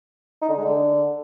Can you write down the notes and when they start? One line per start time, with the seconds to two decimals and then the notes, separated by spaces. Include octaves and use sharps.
0.41 D#4
0.49 D3
0.57 G#3
0.64 D3